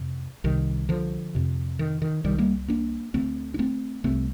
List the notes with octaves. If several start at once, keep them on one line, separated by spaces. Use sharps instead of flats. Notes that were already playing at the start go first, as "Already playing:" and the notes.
Already playing: F2 C3
C2 C3 D#3
D3 F3
F2 C3
D#3
D#3
C2 C3 D#3 G3
G3 A#3
A#3 D4
D2 D3 A3 C4
D4
A3 C4
C2 C3 A3 C4